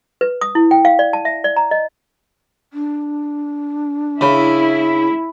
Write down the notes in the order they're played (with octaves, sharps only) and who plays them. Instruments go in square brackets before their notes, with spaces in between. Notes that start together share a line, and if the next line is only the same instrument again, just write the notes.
[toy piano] B4
D#6
E4
G5
F5
D5
A5
E5
D5
A#5
D#5
[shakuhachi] D4
[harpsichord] C#3 [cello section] E4 [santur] B5